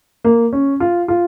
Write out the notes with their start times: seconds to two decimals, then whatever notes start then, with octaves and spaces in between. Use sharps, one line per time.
0.24 A#3
0.53 C#4
0.80 F4
1.08 F4